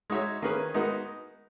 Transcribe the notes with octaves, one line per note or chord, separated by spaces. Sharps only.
G#3 D#4 F#4 C#5 E5
D#3 A#3 C#4 G#4 B4
G#3 B3 D#4 F#4 A#4